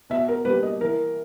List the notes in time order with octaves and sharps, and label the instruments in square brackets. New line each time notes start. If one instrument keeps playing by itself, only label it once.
[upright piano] B2 [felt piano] E5
[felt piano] A#4
[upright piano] G3 A#3 D4 G4 [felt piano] B4
[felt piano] D#5
[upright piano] E3 [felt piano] A#4